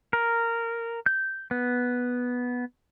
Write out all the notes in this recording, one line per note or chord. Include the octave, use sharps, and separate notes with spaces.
A#4
G6
B3